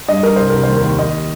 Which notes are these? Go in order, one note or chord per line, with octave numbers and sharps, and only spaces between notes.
G2 D#5
G2 A#4
C2 C5
C2 A#4
D#2 C5
A#4
D#2
D#2 D#5